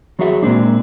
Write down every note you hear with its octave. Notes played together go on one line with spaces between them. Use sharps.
F#3 F#4 G#4 E5 F#5
A#2 G#3 A#3 C4 D4